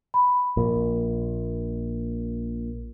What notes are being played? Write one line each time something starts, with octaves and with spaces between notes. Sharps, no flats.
B5
A#1 A#2 A#4